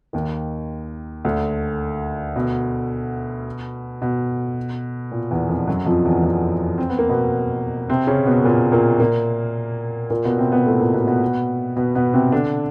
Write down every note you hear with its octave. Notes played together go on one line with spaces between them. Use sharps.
D#2 D#3
D2 D3
B2
B2
A#2
E2 E3
F2 F3
F#2 F#3
F2 F3
E2 E3
F2 F3
C4
B3
A#3
B2 B3
C3 C4
C#3 C#4
B2 B3
A#2 A#3
A#2 A#3
A#2 A#3
A#2 A#3
B2 B3
C3 C4
B2 B3
A2 A3
A#2 A#3
B2 B3
B2 B3
B2 B3
B2 B3
C3 C4
D3 D4